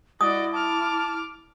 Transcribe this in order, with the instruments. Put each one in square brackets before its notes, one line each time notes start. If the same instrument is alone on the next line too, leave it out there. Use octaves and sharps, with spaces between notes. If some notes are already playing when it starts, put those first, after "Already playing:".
[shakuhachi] E4 [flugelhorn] F#4 [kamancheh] D5 D#5 [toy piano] D#6
[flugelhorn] A5 [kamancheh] D6 F6